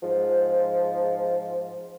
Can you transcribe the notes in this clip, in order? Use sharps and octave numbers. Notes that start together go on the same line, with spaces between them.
G#2 F3